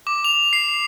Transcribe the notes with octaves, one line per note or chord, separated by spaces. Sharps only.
D6
F7
C7